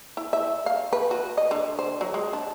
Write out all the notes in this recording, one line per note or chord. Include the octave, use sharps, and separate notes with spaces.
E4
E5
F5
B4
F#4
D#5
D3
C5
F#3
G#3
D4